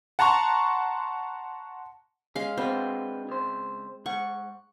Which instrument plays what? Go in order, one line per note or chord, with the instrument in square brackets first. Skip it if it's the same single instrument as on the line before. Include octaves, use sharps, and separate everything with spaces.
[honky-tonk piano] F#5 A5 A#5 C6 C#6
[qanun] G#3 F5 [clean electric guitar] C#4
[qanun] C4 [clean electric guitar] D4 F#4 B4
[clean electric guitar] C#2 C5
[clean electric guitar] G#2 F#5 [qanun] C#6